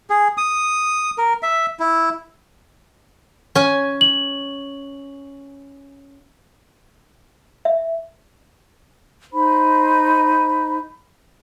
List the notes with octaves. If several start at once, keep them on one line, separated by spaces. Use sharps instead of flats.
G#4
D#6
A#4
E5
E4
C#4 G#5
F#7
E5
D#4 C5 B5